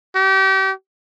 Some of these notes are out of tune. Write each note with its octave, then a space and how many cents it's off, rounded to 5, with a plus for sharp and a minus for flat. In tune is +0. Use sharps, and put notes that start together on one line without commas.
G4 -35